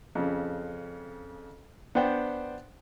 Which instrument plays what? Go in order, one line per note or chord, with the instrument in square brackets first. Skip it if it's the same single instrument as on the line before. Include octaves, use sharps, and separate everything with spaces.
[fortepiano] F2 C#3
B3 D4 C5 F#5 G5